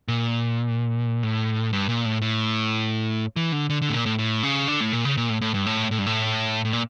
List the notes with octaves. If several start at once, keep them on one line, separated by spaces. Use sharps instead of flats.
A#2
A2
G2
A#2
A2
A2
E3
D3
D3
D3
A2
A#2
A2
A2
C#3
D3
A2
A#2
C#3
A#2
A2
A2
G2
A2
A2
G2
A2
A2
A#2